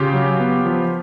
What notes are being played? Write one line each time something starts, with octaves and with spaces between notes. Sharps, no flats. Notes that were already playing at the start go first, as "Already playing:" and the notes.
Already playing: C#3 F4 G4
F#3
B3
F3